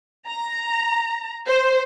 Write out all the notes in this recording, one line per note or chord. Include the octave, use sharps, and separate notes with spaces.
A#5
C5